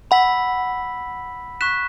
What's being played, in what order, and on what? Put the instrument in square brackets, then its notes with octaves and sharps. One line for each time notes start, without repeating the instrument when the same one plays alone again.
[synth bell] F#5 [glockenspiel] B5 E6 B6 F#7
[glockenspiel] C#6 F#6 B6 E7